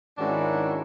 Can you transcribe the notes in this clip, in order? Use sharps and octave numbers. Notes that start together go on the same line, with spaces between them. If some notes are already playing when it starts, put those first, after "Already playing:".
G#2 D#3 C#4 D4 E4 F#4